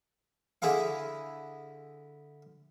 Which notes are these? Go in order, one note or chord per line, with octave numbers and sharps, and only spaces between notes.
D3 E4 G#4 F5